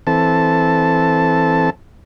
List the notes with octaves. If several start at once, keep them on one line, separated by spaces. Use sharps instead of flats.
E3 C4 A4 A5